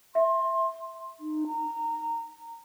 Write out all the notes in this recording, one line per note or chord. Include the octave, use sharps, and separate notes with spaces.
E5 C6
D#4
A#5